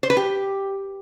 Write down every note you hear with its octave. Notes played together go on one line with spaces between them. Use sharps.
C5
B4
G4